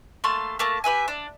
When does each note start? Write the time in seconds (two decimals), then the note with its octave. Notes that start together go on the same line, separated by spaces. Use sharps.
0.24 A3 A#3 A5 C6
0.59 A3 A#3 A5
0.84 G4 B4 E5 G#5
1.08 D4